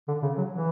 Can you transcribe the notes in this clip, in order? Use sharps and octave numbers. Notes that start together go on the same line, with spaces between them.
D3
C#3
F#3
E3